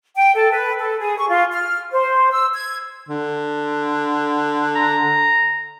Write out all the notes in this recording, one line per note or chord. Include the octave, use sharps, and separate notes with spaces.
G5
A4
B4
A4
G#4
C#6
F4
F6
C5
E6
G#6
D3
A#5